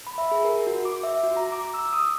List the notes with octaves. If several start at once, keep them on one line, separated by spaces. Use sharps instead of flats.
B5
E5
G#4
A#4
F#4
D6
E5
F#4
A#5
D6
E6
D#6